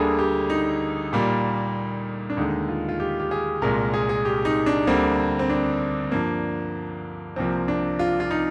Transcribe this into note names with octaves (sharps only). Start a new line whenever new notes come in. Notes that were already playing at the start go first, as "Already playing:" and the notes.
Already playing: D2 D3 G3 A#3 G#4
G4
D#4
A#2 G3 A#3
D4
D#2 D3 G#3 D#4
F4
F4
G4
G4
G#4
C2 A#2 G#3 A#4
G#4
G#4
G4
D#4
D4
D2 D3 G3 A#3 C4
C4
D4
G2 F3 A#3
C2 C3 F3 A#3 C4
D4
F4
F4
D#4